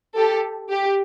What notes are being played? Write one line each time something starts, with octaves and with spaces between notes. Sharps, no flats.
G4 A4
G4